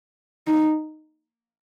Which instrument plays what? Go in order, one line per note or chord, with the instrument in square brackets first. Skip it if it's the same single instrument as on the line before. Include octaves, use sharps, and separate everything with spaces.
[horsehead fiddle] D#4